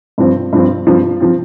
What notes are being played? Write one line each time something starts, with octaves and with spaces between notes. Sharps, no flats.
G2 F3 C4
G2 F3 C4
G2 F3 C4
F3 C4